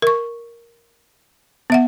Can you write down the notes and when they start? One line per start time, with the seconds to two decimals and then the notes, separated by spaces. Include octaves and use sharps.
0.02 A#4 C#6
1.70 B3 E5 F#5